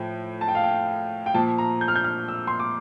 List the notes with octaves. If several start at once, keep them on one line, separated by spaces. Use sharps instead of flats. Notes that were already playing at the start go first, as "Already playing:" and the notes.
Already playing: A2 F3 G5
A5
G5
F5
G5
G5
A#2 F3 A5
A#5
G6
F6
G6
F6
E6
C6
D6